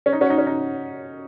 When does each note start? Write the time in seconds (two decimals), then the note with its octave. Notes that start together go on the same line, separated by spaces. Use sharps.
0.06 C#4
0.13 D#4
0.21 C#4 F#4
0.30 D#4
0.38 C#4
0.47 D#4